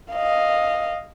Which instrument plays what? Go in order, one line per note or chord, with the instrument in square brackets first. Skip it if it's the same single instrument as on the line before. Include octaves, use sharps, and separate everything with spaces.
[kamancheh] D#5 F5